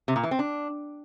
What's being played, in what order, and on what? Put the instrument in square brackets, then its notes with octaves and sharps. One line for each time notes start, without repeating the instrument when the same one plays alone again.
[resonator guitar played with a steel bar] C3
A#2
E3
C4
D4